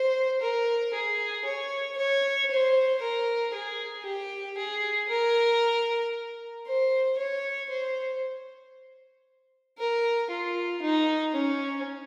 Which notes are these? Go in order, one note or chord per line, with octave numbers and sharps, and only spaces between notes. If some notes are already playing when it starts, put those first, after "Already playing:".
Already playing: C5
A#4
G#4
C#5
C#5
C5
A#4
G#4
G4
G#4
A#4
C5
C#5
C5
A#4
F4
D#4
C#4